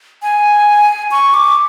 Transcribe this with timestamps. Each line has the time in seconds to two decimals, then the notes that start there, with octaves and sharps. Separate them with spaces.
0.22 G#5
1.11 C#6
1.34 D6